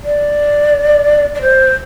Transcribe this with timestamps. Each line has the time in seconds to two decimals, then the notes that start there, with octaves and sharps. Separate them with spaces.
0.04 D5
1.35 D5
1.42 C5